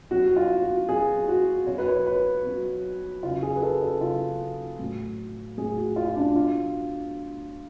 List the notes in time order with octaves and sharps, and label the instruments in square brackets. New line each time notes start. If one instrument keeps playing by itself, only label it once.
[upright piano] B2 F#3 F#4
F#4
F4
F#4
B2 F#3 G#4
F#4
B2 F#3 C#5
B4
C#5
B4
B2 F#3
C#3 F#3 F4
G#4
B4
A4
A4
C#3 F#3 F4
A2 F#3
A2 F#3 G#4
F#4
F4
F4
D4
B2 F#3 F4